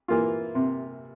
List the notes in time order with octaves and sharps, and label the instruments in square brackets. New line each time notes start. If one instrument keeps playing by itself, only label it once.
[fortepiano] E3 A#3 F4
C3